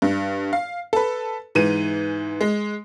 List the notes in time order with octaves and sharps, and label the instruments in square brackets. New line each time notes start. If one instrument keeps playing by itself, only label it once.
[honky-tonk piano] G2
F5
A4 B4
G#2 E3 D#7
G#3